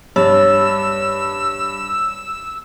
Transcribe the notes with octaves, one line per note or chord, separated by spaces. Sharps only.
G2 C#5 E6